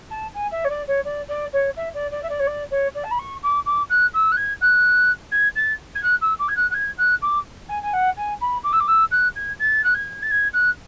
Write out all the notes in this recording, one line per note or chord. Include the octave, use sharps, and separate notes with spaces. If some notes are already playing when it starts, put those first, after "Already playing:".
A5
G#5
E5
C#5
D5
C#5
D5
D5
C#5
E5
D5
D5
E5
D5
C#5
D5
C#5
D5
A5
B5
C#6
D6
D6
F#6
E6
F#6
G#6
F#6
G#6
A6
G#6
F#6
E6
D6
G#6
F#6
F#6
G#6
F#6
D6
G#5
G#5
F#5
G#5
B5
D6
E6
D6
E6
F#6
G#6
A6
F#6
G#6
A6
G#6
F#6